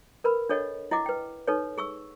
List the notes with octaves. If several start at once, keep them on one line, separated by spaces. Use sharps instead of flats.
A#4 B4 B5
D4 A4 C#5 D#5 F#5
E4 D#5 F#5 D6
B4 G5
D#4 A4 B4 C#5
G#4 C#6 E6